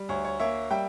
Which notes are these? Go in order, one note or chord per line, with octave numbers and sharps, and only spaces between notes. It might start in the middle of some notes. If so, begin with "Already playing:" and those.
Already playing: G3
D2 C#5
C#5
A#3 C#5 E5
G3 E5 G5